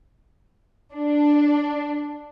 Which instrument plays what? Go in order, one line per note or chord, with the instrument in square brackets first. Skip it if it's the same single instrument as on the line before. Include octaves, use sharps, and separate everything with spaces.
[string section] D4